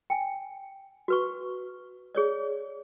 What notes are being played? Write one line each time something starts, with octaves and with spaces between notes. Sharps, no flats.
G5 G#5
F#4 B4 C#6
G#4 C#5 D5